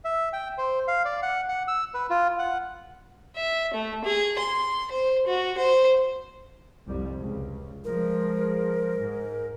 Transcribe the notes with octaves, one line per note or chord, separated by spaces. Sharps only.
E5
G5
C5
F5
D5
F#5
F#5
E6
B4
F4
F#5
E5
A3
G#4
C6
C5
F#4
C5
C2 F2 G3
C#2
F3 G#3 A#4
G#2